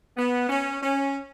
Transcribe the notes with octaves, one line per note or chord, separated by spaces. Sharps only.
B3
C#4
C#4